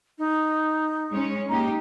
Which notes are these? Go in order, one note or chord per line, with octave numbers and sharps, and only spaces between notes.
D#4
G#3 C#4 C#5
A#3 D#4 G4 A#5